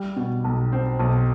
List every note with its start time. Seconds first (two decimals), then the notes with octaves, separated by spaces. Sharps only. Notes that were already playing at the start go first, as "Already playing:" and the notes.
Already playing: G3
0.16 B2
0.44 B1
0.72 C4
0.99 B1